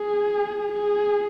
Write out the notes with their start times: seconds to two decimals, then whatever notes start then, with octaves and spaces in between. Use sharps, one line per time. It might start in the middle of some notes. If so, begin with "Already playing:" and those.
Already playing: G#4
0.72 G#4